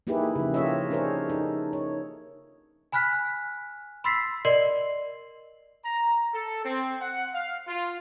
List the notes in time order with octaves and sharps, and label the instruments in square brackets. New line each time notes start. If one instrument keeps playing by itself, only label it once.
[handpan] A#3 D#4 E4 G4 G#4 B4
C#3 F3
F4 G4 A4 C#5 D#5 E5
D4 D#4 G#4 A#4 C5 C#5
D#4 A4
C#5
[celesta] G#5 B5 F6 F#6 B6
B5 C6 E6 A6 B6 C7
A#4 D5 D#5 C6 C7 F#7
[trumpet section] A#5
A4
C4
F#5
F5
F4